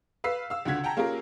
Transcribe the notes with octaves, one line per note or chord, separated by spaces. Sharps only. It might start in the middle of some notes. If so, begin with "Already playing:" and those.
B4 F5 E6 B6 C7
F5 E6
C#2 D3 F#4 G#6 B6
F#5 G5 A5 A#5
A#3 C#4 F4 G4 G#4 A#4